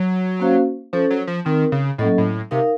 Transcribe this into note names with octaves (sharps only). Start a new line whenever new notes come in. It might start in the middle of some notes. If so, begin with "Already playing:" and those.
Already playing: F#3
A#3 C#4 F#4 C5 F5
F3 C#4 A4 C5
F#3
F3
D#3 C4 D#4 A#4
C#3
A2 F#3 A#3 C#4 A4 D#5
A2
C3 D#4 A#4 F5